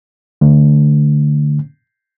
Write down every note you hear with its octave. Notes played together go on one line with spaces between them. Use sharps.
D3 A3